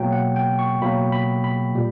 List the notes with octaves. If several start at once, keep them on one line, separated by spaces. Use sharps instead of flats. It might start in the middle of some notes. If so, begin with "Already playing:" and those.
Already playing: B2 F#3 A#3 G5
F#5
G5
C#6
B2 F#3 A#3 B5
B5
B5
A#2 G3